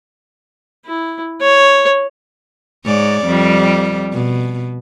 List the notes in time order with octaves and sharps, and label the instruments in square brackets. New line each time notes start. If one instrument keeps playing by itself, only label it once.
[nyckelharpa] E4
C#5
[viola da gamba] G#2 C#5 D5
F2 G3
B2